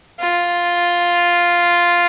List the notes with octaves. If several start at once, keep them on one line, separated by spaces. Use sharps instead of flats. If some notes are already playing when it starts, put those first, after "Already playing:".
F4